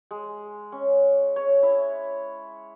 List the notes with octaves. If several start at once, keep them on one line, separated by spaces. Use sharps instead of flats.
G#3
C#4
C#5
E4